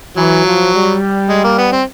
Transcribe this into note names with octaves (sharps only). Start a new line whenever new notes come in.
E3 F#3
F3
G3
G#3
A#3
B3
C4